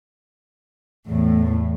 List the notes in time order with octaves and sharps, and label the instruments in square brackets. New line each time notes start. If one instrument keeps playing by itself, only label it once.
[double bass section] E2 [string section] A2